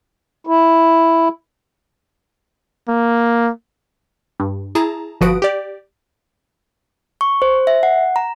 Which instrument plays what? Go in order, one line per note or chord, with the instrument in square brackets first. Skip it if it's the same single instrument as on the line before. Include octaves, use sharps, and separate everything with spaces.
[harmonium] E4
[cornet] A#3
[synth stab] G2
E4 G#4 A5 A#5
G1 F3 F#4 B4 D#6 D7
G4 D5
[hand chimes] C#6
C5
E5
F#5
A#5